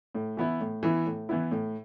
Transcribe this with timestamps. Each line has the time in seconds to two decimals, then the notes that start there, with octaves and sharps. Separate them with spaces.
0.15 A2
0.37 E3 B3 E4
0.60 A2
0.83 E3 B3 E4
1.06 A2
1.29 E3 B3 E4
1.51 A2